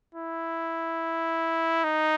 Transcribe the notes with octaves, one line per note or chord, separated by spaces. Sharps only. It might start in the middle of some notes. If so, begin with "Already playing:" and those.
E4
D#4